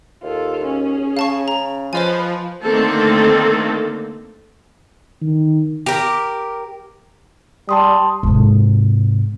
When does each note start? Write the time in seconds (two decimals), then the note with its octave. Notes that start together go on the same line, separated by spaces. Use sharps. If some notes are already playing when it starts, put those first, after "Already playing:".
0.23 D#2 F4 A4
0.65 C#4 G#4
1.17 C#3 F5 A5 C#6
1.48 A#5
1.93 F3 B4 C5 D#5 G#5
2.64 D3 D#3 A3 A#3 C4 A4
5.21 D#3
5.86 G4 A#4
7.69 G3 A5 C6 D#6
8.23 G#2 C3